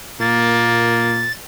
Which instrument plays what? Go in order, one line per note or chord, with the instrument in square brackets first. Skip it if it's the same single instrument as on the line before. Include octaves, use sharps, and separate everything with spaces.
[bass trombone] A#2 [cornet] A#3 [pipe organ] A6